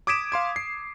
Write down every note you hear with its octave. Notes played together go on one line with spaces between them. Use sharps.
D6 D#6 G#6 B6 D7 E7
F5 C6 G#6
C7